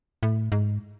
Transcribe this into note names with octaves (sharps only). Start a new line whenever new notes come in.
A2
G#2